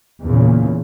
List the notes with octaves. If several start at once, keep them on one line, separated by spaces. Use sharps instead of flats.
E2 A#2 C#3